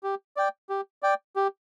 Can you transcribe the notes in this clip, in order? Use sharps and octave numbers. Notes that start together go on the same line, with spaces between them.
G4
D5 G5
G4
D5 G5
G4